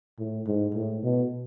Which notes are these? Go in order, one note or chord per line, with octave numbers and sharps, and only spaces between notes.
A2
G#2
A2
B2